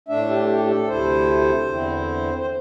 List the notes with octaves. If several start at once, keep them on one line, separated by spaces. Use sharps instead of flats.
A2 A3 D4 E5
G4
G4
A4
D2 C3 A3 E4 C5
E2 D3 C4 E4
C5